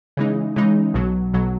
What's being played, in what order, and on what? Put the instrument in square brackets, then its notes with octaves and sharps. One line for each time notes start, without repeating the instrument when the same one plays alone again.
[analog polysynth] C#3 E3 G#3 D#4
C#3 E3 G#3 D#4
B1 B2 F#3
B1 B2 F#3